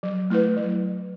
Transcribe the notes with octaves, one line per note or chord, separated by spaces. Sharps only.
F#3
A3 E4 B4
F#3